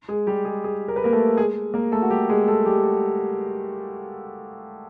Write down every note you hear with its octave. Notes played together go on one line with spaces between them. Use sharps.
G#3 G#4
G3 G4
G#3 G#4
G#3 G#4
A#4
B4
A#3 A#4
A3 A4
G#3 G#4
A#3 A#4
A3 A4
F#4
G3 G4
G#3 G#4
A3 A4
G3 G4